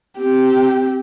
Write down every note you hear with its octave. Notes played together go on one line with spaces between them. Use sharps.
C4 G4